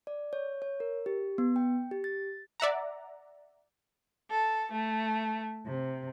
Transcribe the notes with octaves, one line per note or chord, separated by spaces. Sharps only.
D5
C#5
C#5
A#4
G4
B3
G5
G4
A6
D5 E5 F#5 A#5
A4
A3
C3